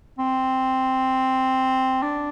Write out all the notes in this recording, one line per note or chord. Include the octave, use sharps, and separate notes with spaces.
C4
D4